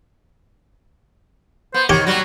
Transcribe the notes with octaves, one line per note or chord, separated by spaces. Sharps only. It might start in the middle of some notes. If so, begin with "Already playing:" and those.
B3 C5
D#3 G4 C#5
F#3 G3 F#4